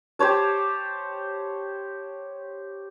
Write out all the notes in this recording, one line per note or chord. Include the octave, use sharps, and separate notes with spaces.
G4 C5 C#5 A5